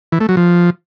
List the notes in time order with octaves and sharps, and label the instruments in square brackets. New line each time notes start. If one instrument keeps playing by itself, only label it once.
[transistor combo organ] E3
A3
F#3
F3